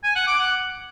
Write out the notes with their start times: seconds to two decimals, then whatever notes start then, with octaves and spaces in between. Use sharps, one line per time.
0.04 G#5
0.15 F#5
0.27 D6
0.39 F#5